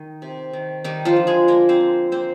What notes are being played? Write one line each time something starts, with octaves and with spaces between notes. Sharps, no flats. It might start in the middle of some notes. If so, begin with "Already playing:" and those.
Already playing: D#3 D#4
C3
D#3
D#3 G3 D#4
F3 F4
D3
G#3 G#4
D3 A#3 A#4
C4 C5
D3
A#3 C4 C5